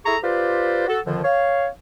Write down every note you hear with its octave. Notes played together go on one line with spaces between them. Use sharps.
E4 G#4 A4 A#5 C#6
F4 G4 B4 C5 D5
F#4 A4
F2 D3 D#3 F3
C#5 F5